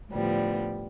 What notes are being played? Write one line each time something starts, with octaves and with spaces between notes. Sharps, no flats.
A2 D3 F3 G3 B3